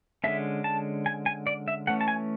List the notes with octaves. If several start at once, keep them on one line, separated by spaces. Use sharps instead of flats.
D3 G#3 C#4 E5
A5
G#5
G#5
D5
E5
E3 A3 C#4 F#5
A5
G#5